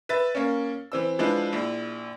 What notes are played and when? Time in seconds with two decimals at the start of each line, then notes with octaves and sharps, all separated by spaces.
0.09 B4 E5 A6
0.35 A#3 C#4
0.92 E3 C4 E6
1.19 F3 G#3 D4 E4 B4
1.53 A#1 E4